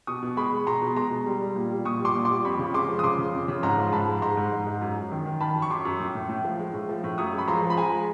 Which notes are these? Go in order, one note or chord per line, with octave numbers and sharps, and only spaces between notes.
B2 C#6 D#6
B2
G#3 B5 C#6
G#3
B2 A#5 C6
B2
G#3 A#5 C6
B2
G3
G3
A#2
G3
A#2 C#6 D#6
G3 C6 D6
A#2
G3 C6 D6
F2 B5 C#6
C#3
G#3 C6 D6
F3
D#6
C#3 C6 D6
C#3
F2
C#3
G#2 A#5 C6
F3
G#2 A5 B5
G#3
G#2 A#5 C6
G#2
G#2
G#2
F#2
F#2
D#3
D#3
D#3 A5 B5
F#2
C#6
F#2 C6 D6
F#2
A2
A2
A2
F3
G#3
A2
F3
A2
F#2 C#6 D#6
G#3
B5
F3 A#5 C6
F3
B5
G#3 G#5 A#5
G#3